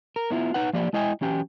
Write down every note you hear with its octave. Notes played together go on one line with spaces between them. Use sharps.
A#4
B3 C#4 E4 F4
D#4 B4 F#5
F3 A#3 G4 D5
G#3 E4 D#5 G5 G#5
E3 F#3 C#4 G4 G5